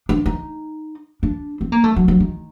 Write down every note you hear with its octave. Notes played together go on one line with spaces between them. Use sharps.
D4
D#4
D4
C4
A#3
A3
F#3
F#3
D#3